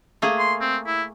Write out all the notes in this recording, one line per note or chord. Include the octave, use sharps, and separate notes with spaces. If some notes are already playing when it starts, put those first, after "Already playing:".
A3 A#3 G#4
C6
C4
E4